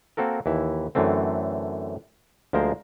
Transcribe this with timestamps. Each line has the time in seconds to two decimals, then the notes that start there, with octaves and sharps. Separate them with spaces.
0.17 A#3 C4 F#4 A4 A#4
0.46 D#2 E3 E4
0.95 F#2 D3 E3 A3 C4
2.53 D2 F3 G#3 A#3 A#4 C5